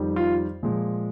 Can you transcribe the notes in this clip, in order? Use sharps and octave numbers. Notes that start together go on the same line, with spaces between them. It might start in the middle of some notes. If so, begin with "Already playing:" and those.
Already playing: F2 D#3 G3
F4
A#2 F3 G#3